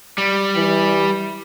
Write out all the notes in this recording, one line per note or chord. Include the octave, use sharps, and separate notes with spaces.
G3
E3